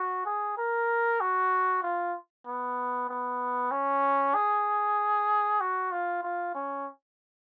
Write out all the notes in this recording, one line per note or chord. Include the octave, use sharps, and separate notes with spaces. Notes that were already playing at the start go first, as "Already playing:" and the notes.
Already playing: F#4
G#4
A#4
F#4
F4
B3
B3
C#4
G#4
F#4
F4
F4
C#4